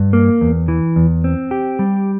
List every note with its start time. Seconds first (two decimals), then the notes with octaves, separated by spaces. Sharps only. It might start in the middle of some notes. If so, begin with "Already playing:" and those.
Already playing: G2
0.13 A#3
0.41 E2
0.68 E3
0.96 E2
1.24 C4
1.51 G4
1.79 G3